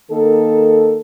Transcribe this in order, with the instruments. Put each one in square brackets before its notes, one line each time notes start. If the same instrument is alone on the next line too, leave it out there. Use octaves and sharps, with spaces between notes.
[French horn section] D#3 A#3 A4